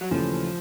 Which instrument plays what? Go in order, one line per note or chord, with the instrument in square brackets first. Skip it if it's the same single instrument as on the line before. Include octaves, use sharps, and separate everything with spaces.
[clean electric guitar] F#3
[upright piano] D#2 C#3 E3 A3 [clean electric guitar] F3